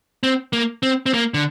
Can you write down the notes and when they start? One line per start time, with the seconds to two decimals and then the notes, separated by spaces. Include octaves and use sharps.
0.23 C4
0.53 A#3
0.83 C4
1.06 C4
1.14 A#3
1.34 D3